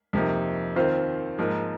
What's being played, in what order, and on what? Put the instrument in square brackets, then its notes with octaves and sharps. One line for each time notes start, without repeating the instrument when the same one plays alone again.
[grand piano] F2 C3 F3 A#3 D#4
D#2 D#3 C4 F4 C5
G#2 F3 A#3